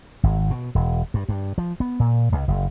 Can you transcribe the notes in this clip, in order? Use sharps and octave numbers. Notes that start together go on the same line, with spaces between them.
G#1
B2
E1
G2
G2
F3
B3
A#2
C#2
F#1